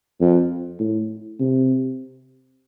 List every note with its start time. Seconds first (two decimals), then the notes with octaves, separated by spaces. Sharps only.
0.21 F2
0.80 A2
1.40 C3